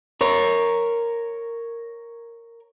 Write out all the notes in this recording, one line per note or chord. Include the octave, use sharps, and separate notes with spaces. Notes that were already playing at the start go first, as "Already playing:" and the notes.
A#4 C#5